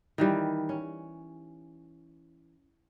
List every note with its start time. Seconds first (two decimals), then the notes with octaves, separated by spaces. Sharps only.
0.18 D#3 E3 G3
0.69 C#4